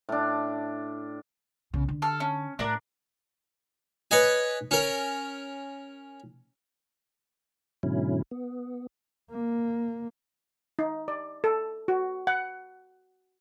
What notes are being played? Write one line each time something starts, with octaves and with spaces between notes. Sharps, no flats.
A2 D4
B1 C#3
D3
A4 F6
C#4
A2 D4 A#4 D5
B4 C#5 D#5 G#5
C#4 A#4
G#2 B2 D3 F#3 C#4 E4
B3
A#3
D#4
D5
A4
F#4
F#5